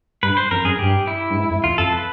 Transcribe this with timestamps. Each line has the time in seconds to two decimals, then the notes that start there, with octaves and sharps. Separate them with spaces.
0.23 G2 B4
0.37 C5
0.51 F2 A#4
0.64 F#2 G#4
0.79 G2 G4
1.07 E4
1.30 G2
1.36 G#2
1.50 F2
1.64 E2 F4
1.78 F2 A4
1.93 B4